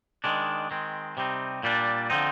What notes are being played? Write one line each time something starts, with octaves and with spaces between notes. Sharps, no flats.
D#3 G#3 D4
D#3 G#3 C4
C3 G3 C4 D#4
A#2 G3 D4
D3 F3 C4 D#4